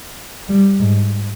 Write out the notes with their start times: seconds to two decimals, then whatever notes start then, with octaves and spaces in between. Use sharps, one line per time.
0.49 G3
0.79 G#2